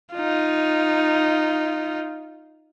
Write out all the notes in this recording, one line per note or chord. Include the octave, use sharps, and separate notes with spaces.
D#4 F4